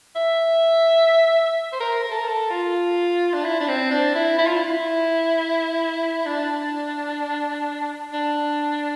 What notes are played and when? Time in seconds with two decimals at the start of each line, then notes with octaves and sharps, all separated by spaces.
0.16 E5
1.72 C5
1.80 A#4
2.04 A#4
2.11 A4
2.18 A#4
2.27 A4
2.50 F4
3.34 D4
3.44 E4
3.60 D4
3.68 C4
3.91 D4
4.15 E4
4.38 E4
4.47 F4
4.57 E4
6.26 D4
8.13 D4